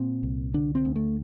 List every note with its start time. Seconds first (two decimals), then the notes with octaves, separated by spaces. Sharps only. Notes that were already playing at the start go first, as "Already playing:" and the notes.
Already playing: A#2 C4
0.23 C2
0.54 D3 D4
0.75 C4
0.85 D2
0.96 A3